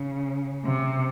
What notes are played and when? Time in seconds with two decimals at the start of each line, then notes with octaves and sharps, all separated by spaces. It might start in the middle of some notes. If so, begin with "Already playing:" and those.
Already playing: C#3
0.65 C3